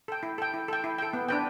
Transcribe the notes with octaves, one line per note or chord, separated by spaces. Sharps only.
A4 G5
E4
A4 G5
E4
A4 G5
E4
A4 G5
B3
D4 B4 G5